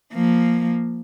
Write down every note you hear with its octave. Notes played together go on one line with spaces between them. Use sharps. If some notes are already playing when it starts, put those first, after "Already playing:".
F3 A#3